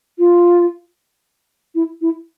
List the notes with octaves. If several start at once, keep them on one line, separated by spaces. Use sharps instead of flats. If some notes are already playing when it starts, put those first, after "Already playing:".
F4
E4
E4